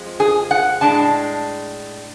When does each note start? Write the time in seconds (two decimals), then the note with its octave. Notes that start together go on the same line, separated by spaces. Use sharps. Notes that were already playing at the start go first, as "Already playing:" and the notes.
Already playing: F2 F3 G#3
0.20 G#4
0.51 F#5
0.81 A2 G#3 D4 A5